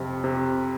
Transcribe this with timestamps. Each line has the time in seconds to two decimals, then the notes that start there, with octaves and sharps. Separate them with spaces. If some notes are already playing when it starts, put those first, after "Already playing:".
Already playing: F2 C3
0.24 C3